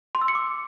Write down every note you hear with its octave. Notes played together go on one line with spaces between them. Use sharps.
C6
E6
C#7
D6